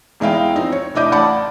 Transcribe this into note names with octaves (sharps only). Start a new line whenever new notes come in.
E2 G#3 D#4 E4 F5 G5
F3 C4 D#4
C#5
F1 D4 E4 D#5 D6 G6
A1 D5 F#5 A5 B5 D6